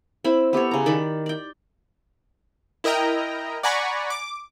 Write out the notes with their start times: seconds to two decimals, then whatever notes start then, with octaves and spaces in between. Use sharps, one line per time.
0.24 C4 E4 B5
0.53 B3 G4 A4 C#5
0.71 C#3 A#5
0.86 D#3 D5 B5 D6
1.26 D5 G5
2.84 E4 A#4 D#5 G5 A#5
3.63 D5 F#5 G#5 A#5 B5 C#6
4.10 D6